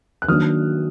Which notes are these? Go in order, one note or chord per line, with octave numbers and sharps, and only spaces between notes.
F#6
D#3 F#3 A#3 D4 D#6 F6